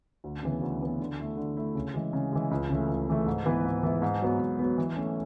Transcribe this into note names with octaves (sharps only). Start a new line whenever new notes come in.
D2
C#3 E3 B3
D2
C#3 E3 B3
D3
A3 E4
D3
A3 E4
C#3
E3 G#3
C#3
E3 G#3
C#2
C#3 E3 A3
C#2
C#3 E3 A3
G#2
E3 B3 E4 B4
G#2
E3 B3 E4 B4
G#2
F#3 B3
G#2
F#3 B3
E3
A3 C#4